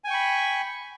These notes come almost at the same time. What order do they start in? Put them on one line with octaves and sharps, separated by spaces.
G#5 G5 C#6 B5